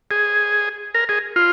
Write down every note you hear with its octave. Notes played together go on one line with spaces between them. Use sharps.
G#4
A#4
G#4
F4